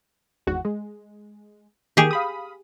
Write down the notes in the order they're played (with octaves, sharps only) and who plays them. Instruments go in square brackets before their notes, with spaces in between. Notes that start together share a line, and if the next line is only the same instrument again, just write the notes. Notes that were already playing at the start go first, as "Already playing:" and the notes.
[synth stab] G#1 E2 F#4
G#3
[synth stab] D#3 A#3 [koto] G4 G#4
[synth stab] F5 B5 D#6